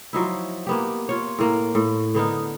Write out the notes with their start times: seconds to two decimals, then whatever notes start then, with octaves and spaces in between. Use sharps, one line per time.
0.13 F3 F#3 D#4 E4
0.67 A#3 B3 G4
1.09 F4 C#5
1.39 A2 A#3 A#4
1.75 A2
2.15 D3 B3 D#4 A#4